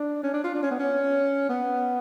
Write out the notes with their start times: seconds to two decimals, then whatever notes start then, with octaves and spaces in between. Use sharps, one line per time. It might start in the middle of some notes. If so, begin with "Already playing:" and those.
Already playing: D4
0.23 C#4
0.34 D4
0.44 F4
0.55 D4
0.63 C#4
0.71 B3
0.79 C#4
1.49 B3